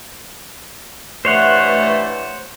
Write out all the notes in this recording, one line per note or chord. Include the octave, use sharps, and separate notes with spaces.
G2 E3 A3 C5 C#5 F#5